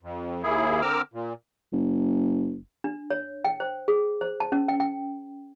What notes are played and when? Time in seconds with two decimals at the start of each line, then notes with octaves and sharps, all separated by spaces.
0.03 F2
0.43 D#2 A#3 E4 G#4
0.82 D3 C4 A#4 D6 E6 F6
1.13 A#2
1.73 F#1
2.84 D4
3.10 C#5
3.44 G5
3.60 C5
3.88 G#4
4.21 C5
4.40 A5
4.52 C#4
4.68 G5
4.80 G5